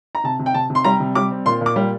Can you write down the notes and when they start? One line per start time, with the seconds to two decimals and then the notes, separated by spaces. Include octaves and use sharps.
0.15 A#5
0.24 C3 A5
0.39 C3
0.46 G5
0.54 C3 A5
0.70 C3
0.75 C6
0.85 G3 A#5
1.00 C3
1.15 G3 D6
1.31 C4
1.46 A#2 C6
1.61 A#2
1.66 D6
1.76 G3